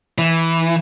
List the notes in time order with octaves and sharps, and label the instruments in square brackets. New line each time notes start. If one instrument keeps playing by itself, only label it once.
[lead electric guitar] E3